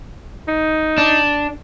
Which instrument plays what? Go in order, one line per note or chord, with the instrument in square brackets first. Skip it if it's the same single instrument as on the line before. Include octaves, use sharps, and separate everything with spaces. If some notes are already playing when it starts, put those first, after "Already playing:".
[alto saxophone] D#4
[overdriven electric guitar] D4